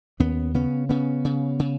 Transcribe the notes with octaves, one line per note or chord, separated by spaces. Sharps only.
D#2 B3 C#4
C#3 B3 C#4
C#3 B3 C#4
C#3
C#3